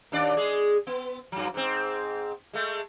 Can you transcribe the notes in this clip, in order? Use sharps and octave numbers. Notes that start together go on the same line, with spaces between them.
D#2 D4 D5
G#3 G#4
B3
G2 F#3
G#2 C4
G#3 A3